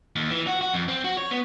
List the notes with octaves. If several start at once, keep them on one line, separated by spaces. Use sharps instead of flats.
D#2
E3
F#4
F#4
F2
C4
F#4
C#5
B3